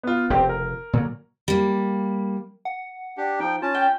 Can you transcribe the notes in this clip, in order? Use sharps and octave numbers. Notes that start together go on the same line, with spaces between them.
B3 F4
F1 C#3 F3 C4 G4
A#4
A#2 D3 F#3
G3 A#3
F#5
D4 G4
F3 D#4 G5
C#4 F4 A5
G5